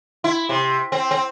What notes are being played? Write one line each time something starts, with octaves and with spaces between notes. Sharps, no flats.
E4
C3
C4
C4